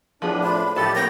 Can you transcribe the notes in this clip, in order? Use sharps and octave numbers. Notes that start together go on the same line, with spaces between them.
A2 F3 B3 D4 G#4
F4 C5 B5
A2 F3 G4 A4 A5 A6
A#3 B3 A#4 C#5 G5 G6 A#6